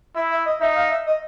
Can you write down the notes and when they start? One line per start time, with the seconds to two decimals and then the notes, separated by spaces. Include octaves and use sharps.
0.15 E4 E5
0.31 E5
0.46 D#5
0.61 D#4 E5
0.76 F5
0.90 E5
1.07 D#5